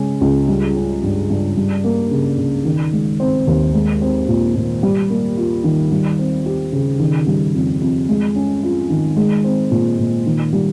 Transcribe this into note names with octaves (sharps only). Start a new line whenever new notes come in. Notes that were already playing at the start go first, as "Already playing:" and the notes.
Already playing: C#3 G#3 C#4
C#2
G3
C#4
G2
G2
G3
A#3
C#3
C#3
D#3
G#3
C4
D#2
G#3
C4
A#2
A#2
G3
A#3
F4
D#3
G3
C4
G4
C#3
D#3
G3
F2
F2
G#3
C#4
F4
D#3
G#3
C4
A#2
A#2
D#3
G3